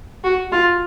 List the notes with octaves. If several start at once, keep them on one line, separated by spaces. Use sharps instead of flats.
F#4
F4